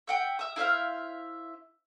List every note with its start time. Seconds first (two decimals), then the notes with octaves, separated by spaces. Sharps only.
0.07 E5 F#5 G5
0.39 E5 D#6
0.56 E4 C5 E5 F5